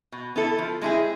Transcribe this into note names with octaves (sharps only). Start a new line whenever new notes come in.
B2
B3 E4 A4
F3
G#3 C4 E4 G#4